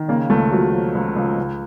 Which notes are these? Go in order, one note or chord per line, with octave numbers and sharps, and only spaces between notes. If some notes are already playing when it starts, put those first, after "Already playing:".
Already playing: D#3
C#3 A#3
C#2 A3
F3 F#3
F3
C#2
C#2
C#2